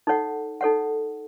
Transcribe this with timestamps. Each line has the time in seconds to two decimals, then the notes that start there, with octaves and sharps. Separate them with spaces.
0.07 D#4 A4 C#5 F#5
0.61 D#4 A4 C#5 F#5